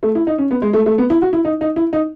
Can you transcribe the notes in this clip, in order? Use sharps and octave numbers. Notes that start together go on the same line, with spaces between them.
A3
E4
D#4
C#4
B3
G#3
A3
A3
B3
E4
F#4
E4
D#4
D#4
E4
D#4